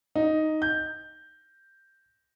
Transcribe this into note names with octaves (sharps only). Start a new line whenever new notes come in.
D#4
G6